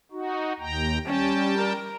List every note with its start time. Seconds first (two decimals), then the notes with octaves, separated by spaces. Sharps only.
0.12 D#4 F#4
0.59 D#2 G5 A#5
1.06 G3 C#4 G5 A5
1.57 A#4